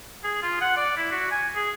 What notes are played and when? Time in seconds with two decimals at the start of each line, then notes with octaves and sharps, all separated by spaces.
0.24 G#4
0.42 F4
0.61 F#5
0.77 D5
0.97 E4
1.12 F#4
1.31 G#5
1.56 G#4